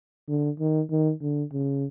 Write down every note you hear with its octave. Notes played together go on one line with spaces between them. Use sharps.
D3
D#3
D#3
D3
C#3